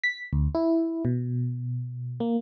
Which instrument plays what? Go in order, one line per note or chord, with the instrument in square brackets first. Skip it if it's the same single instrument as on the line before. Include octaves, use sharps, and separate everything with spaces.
[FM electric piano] B6
D2
E4
B2
A#3